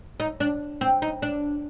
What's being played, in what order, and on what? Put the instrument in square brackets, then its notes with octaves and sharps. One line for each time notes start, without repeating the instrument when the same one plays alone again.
[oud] D#4
D4
C4
D#4
D4